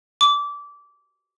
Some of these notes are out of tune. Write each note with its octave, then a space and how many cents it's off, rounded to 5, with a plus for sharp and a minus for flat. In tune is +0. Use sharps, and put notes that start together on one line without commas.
D6 -20